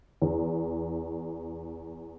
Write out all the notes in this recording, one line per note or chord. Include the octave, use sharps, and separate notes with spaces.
E2